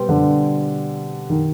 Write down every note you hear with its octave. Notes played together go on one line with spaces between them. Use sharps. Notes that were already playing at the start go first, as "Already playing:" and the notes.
Already playing: B2 G3 C4 G4
D3
D#3